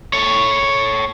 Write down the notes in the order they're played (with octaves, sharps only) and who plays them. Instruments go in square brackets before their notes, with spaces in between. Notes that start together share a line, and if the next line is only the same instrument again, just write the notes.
[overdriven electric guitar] A4 C#5